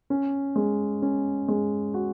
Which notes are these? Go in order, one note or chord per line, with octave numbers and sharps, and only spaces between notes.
C#4
G#3
C#4
G#3
F#4